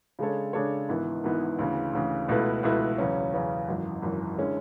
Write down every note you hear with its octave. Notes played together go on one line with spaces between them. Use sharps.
C#3 G#3 D4 A4 C#5
C#3 G#3 D4 A4 C#5
G#1 G#2 E3 B3 E4
G#1 G#2 E3 B3 E4
D2 C#3 E3
D2 C#3 E3
C#2 B2 A3 E4 B4
C#2 B2 A3 E4 B4
E2 C#3 F#3 C#4
E2 C#3 F#3 C#4
G#1 F#2 E3
G#1 F#2 E3
D3 G#3 C#4 E4